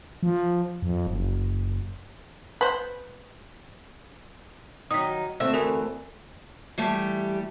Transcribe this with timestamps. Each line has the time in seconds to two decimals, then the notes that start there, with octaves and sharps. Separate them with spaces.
0.23 F3
0.82 F2
1.07 F#1
2.61 B4 C5
4.91 D#3 F#3 D#4 D#6 B6
5.40 D2 A3 C4 E5
5.54 E3 A#4 B6
6.78 E3 G3 A3 G4